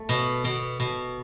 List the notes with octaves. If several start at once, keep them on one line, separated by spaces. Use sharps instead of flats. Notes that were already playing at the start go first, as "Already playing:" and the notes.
Already playing: A3
B2
B2
B2